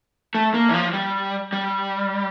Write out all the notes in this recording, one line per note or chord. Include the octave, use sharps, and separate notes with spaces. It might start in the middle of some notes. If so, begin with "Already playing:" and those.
A3
A#3
E3
F3
G3
G3